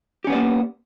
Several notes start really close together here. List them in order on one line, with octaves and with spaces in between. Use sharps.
G4 C#4 B3 D5 A#3